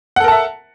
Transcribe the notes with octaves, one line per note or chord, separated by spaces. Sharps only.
A4 A#4 E5 F#5 A5